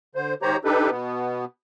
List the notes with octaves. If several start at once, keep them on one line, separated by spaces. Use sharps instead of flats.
D3 C5
G#2 D#3 G4 C5 C#5 A#5
D4 D#4 G4 A4 B4
B2 B3